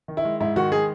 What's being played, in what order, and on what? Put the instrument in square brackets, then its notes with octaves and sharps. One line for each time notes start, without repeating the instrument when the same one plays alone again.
[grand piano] D#3
E4
G#3
G#2 E4
D#3 F#4
G#3 G#4